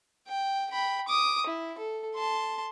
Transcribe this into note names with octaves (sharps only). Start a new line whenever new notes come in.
G5
G5 B5
D6 D#6
E4
A4
A5 C6